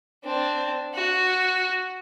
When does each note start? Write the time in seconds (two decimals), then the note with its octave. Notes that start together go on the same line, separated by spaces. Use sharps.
0.25 C4 D4
0.94 F#4